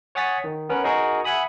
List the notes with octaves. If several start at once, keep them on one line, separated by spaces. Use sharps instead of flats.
C#5 F#5 G#5 D#6 A6 B6
D#3
B3 C#4 A#4 B4
D#4 F#4 G#4 A#4
E5 F#5 G#5 B5 D#6